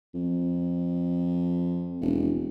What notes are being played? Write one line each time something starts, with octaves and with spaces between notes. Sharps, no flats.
F2
E1